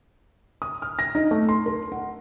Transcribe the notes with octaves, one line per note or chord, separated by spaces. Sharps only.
D#6
F6
A#6
D#4
A3
C6
A#4
F#5